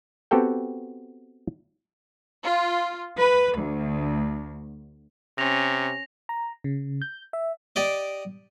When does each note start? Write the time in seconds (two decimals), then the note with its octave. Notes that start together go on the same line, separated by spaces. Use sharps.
0.31 B3 C4 F#4 G4 A4 G5
2.44 F4
3.18 B4
3.57 D2
5.38 C3 C#4 A#6 F7
6.29 A#5
6.64 C#3
7.02 G6
7.33 E5
7.76 G4 D5 D#5